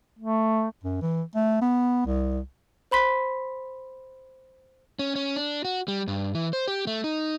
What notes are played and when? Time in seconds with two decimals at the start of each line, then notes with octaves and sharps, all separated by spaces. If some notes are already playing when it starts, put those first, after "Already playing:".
0.19 A3
0.84 F#2
1.02 E3
1.35 A3
1.62 B3
2.06 C2
2.91 C5 B5 C6 B6
4.99 C#4
5.16 C#4
5.36 D4
5.65 F#4
5.88 G3
6.08 G2
6.35 E3
6.53 C5
6.67 G4
6.87 A3
7.04 D#4